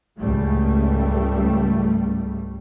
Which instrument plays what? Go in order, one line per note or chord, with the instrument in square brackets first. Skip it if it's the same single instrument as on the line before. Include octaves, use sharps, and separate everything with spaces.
[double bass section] C#2 G#2 G3 A3